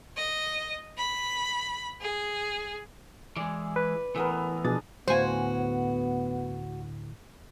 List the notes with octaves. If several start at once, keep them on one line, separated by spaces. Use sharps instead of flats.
D#5
B5
G#4
E3 G#3 D5
B4
A2 E3 B3 A#4
B2 F3 D4 G#4 A6
D2 A2 B3 F#4 C5 F5 G#5